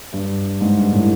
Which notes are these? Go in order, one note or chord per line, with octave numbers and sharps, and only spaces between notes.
G2
G#2
G2
A2